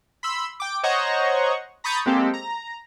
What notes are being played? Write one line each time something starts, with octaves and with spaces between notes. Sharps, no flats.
B5 C6 E6
G5 D6
C5 C#5 D#5 F#5 A#5 C#6
A#5 B5 C#6 D#6 G6 A6
G#3 A#3 C4 G4 A4
A#5